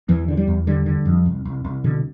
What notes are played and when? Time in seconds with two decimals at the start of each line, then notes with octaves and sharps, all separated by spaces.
0.09 E2 E3
0.28 D3
0.37 G3
0.48 E2
0.67 D3 G3
0.86 D3
1.05 F2
1.26 C2
1.45 C2
1.64 C2
1.84 B2 D3